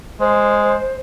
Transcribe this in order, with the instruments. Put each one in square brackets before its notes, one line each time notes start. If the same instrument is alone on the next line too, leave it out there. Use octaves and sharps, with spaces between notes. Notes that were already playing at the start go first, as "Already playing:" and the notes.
[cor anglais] G#3 [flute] C5